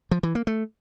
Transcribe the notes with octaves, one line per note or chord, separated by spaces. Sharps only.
F3
E3
A#3
A3